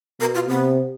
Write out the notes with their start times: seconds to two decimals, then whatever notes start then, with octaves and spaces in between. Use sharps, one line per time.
0.20 B2 A#4
0.35 F4
0.48 C3 B3